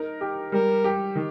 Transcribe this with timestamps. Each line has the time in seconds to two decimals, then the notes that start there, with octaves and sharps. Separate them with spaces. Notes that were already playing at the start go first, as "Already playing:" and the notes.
Already playing: D#4 A#4
0.21 G4
0.52 G3 A#4
0.84 G4
1.15 D#3